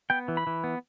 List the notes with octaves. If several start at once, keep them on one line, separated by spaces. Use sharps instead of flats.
B3 G5
E3
B5
E3
B3